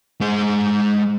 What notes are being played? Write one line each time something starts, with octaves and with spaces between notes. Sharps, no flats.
G#3 C5